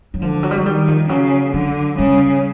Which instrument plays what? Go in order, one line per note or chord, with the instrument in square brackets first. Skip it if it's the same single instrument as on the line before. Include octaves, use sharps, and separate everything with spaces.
[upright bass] F#3
[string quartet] D3 [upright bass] F3
[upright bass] F#3
G3
F#3
[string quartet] D#3 [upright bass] G3
[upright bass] F3
[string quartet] C#3 [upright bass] F#3
[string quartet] D3 [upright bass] F#3
[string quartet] C#3 [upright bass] G3